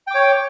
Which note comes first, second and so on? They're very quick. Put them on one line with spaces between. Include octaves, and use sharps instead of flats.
G5 D6 C#5